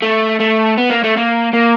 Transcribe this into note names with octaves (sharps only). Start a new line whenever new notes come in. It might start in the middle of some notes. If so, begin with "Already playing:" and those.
A3
A3
B3
A#3
A3
A#3
A#3